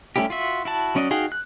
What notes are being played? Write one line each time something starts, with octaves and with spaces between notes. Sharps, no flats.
G3 A3 C#4 E4 G4
F4 F#4 E5
E4 F#4 A5
F#3 C#4 D5 D#5
D#4 F#4 G#4 F5 G5
F#6